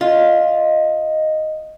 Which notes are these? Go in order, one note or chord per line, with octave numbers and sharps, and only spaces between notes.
F4 D#5